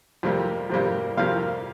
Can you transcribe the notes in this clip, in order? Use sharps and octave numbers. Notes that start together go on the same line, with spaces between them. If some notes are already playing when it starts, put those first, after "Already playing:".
F2 C3 G3 A#3
F2 C3 G3 A#3
F2 C3 G3 A#3 F5